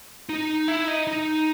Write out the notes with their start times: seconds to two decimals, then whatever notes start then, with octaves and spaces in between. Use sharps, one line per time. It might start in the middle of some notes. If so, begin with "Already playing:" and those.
0.29 D#4
0.68 E4
0.87 D#4
1.07 D#4